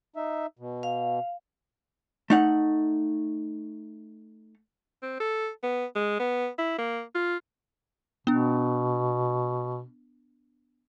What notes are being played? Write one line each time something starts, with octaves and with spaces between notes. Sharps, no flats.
D#4 E5
B2
F5
A3 D#4 F#5
C4
A4
B3
G#3
B3
E4
A#3
F4
B2 B3 D4